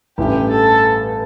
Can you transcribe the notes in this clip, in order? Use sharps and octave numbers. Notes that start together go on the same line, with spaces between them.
A1 G2 E3 A3 G4
A4